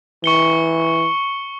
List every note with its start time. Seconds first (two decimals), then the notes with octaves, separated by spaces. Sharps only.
0.24 E3 C#6 C#7 G7